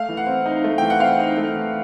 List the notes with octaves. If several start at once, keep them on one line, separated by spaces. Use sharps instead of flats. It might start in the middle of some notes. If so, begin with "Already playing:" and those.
Already playing: A3 F5
E3
F#5
C4
D#4
A3
E3 G5
F#5
C4 F5
D#4
A3
E3